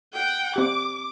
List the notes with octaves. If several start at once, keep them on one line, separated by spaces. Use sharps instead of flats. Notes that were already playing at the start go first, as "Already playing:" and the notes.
F#5 G5
C4 G4 D6